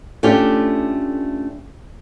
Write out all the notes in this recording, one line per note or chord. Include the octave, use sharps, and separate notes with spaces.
A3 C#4 D4 F4 G4